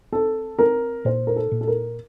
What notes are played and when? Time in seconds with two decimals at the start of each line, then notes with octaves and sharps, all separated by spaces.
0.12 C4 A4
0.59 C4 A#4
1.05 A#2 C5
1.27 A#4
1.36 A4
1.52 A#2
1.61 A4
1.68 A#4